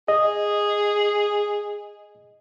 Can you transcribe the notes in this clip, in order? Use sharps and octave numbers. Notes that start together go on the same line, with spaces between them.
G#4 D#5